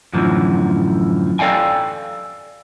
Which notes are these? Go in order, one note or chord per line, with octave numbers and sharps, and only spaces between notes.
F#2 A2 D3 E3 F3
A4 D5 F5 G5 G#5